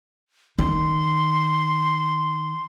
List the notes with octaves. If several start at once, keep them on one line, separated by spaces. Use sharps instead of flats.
D#3 C6